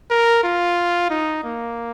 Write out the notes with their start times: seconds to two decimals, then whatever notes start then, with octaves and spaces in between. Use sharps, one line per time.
0.10 A#4
0.43 F4
1.10 D#4
1.44 A#3